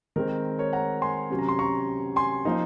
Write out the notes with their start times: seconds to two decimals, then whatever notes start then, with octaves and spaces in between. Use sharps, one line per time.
0.16 D#3 G#3 C4 A#4
0.58 A#4 C#5
0.73 F#5 A#5
1.02 G#5 C6
1.30 C3 F#3 C#4
1.38 A#5
1.49 C6
1.59 A#5 C#6
2.16 G#5 C6
2.45 F3 A#3 D#4